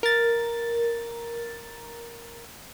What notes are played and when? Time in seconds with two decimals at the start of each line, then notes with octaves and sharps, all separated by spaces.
0.03 A#4 A6